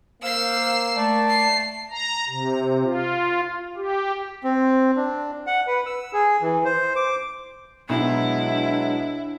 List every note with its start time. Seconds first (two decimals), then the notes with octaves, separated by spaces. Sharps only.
0.22 A#3 C5 F5 E6 C7
0.96 A3 D5 A5
1.29 C7
1.91 A#5
2.29 C3
2.84 F4
3.77 G4
4.43 C4
4.96 D4
5.47 F#5
5.67 B4
5.86 E6
6.13 G#4
6.41 E3
6.65 C5
6.96 D6
7.89 B1 F#3 G#3 B3 D4 E4